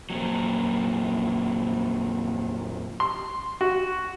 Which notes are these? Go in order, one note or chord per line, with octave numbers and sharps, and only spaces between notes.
F2 A#2 F#3
C6
F#4